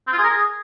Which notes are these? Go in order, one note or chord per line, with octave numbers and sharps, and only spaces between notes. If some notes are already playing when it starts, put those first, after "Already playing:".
C4
F4
G#4
A#4
G#4